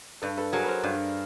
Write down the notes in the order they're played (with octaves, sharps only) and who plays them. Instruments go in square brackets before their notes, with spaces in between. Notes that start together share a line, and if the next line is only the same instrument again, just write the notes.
[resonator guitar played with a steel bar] G2 [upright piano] A4 B4
[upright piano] A4 B4
[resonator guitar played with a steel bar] F#3 [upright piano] G#4 A#4
[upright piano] B4
A#4 C5
[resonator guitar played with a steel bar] G2